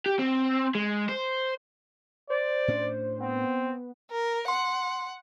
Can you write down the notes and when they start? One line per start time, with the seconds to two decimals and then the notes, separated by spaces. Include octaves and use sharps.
0.06 G4
0.19 C4
0.75 G#3
1.09 C5
2.30 C5 D5
2.68 A2 C#4 D4
3.20 B3 C4
4.11 A#4
4.48 F#5 C6